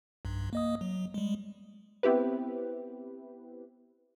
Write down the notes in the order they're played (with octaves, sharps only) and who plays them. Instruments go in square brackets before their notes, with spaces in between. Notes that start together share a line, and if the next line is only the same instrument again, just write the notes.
[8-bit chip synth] B1 G2
A#3 D#5 D#6
F#3
G3 G#3
[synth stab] B3 C4 E4 G4 B4